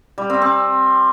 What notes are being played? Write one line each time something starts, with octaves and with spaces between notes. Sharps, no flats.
G3
C4
C4